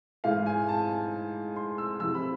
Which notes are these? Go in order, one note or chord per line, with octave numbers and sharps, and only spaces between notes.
G#2 E3 F5
G#5
A5
C6
E6
F2 C3 E3 E6
B5